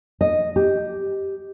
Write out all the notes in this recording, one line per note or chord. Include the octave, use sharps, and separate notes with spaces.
D#5
G4